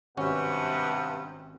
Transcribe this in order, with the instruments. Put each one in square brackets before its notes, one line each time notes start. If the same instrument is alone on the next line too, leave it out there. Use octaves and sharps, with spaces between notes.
[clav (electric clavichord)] G#1 C#4 F#4 [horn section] G2 C3 [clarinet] F#5